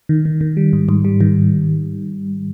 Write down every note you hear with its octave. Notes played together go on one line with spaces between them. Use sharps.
D#3
D#3
D#3
G3
G#2
G#2
G3
D#3